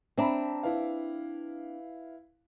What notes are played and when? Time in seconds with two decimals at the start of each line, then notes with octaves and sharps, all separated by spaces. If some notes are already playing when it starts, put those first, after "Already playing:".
0.18 C4 D4 E5 A#5 B5
0.63 E4 B4 F5